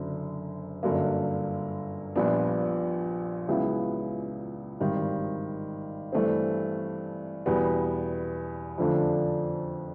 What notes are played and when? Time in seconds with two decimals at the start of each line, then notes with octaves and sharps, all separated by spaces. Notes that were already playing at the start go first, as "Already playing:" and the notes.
Already playing: F#1 F#2 D3
0.83 G1 F#2 D3 F#3 A#3
2.16 A#1 A#2 G3 B3 D4
3.48 C#2 C#3 F#3 B3 E4
4.80 G#1 G2 D#3 G3
6.12 G2 E3 A3 C4
7.46 E2 B2 G3 B3
8.78 F2 D3 F3 A3 D4